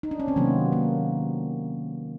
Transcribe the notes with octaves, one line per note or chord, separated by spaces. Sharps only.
D#4
D4
C#4
C4
C3 D#3 F#3 A#3 B3
A#3